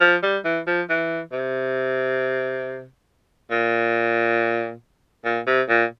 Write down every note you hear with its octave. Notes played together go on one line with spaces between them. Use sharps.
F3
G3
E3
F3
E3
C3
A#2
A#2
C3
A#2